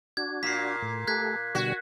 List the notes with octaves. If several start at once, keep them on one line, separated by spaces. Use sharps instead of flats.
D4 F#4 G#6
A#2 B6 C7
A2
A3 G4 A4 F#6 G#6 B6
B2 D3 G3 F#4